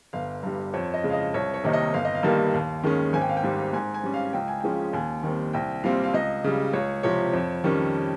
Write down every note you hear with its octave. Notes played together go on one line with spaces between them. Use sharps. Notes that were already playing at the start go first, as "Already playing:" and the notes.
G1 F5
G2 G3
F2 C#5
D#5
C#3 G#3
F5
D#5
C2 C#5
C#5
C3 D#3 A#3 D#4
D#5
G1 F5
D#5
F5
G2 D#3 G3 A#3
D#2
D#3 G#3 C#4
G#1 G#5
G5
F5
G5
G#2 G3
G#2 G#5
G#5
G3 C#4
F5
C#2 G5
G#5
C#3 F3 G#3 C#4 G5
D#2 G#5
D#3 G3 C4
C2 G5
A#2 G3 C4 F5
F5
C#2 D#5
C#3 G3
C#2 C#5
C3 F3 C#5
F2
D#3 G3 C#4